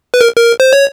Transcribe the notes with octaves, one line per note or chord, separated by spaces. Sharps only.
B4
A#4
A#4
C5
C#5